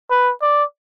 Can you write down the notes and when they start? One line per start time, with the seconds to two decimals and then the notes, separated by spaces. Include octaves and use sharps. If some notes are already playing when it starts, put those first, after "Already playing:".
0.10 B4
0.42 D5